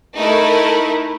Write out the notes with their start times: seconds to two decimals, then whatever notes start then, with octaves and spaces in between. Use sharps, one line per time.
0.16 A3 D#4 E4 A#4